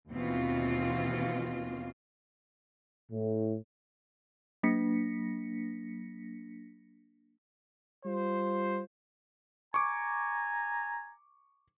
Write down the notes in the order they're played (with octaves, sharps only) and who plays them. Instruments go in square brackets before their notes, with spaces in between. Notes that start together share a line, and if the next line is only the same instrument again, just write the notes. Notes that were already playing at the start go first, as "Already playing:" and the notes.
[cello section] D#2 B2 E3 C4 F4
[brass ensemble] A2
[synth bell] F#3 A#3 D4 A#6 B6 C#7
[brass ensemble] G3 F4 C5
[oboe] G#5 [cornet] A#5 [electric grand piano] C#6 D6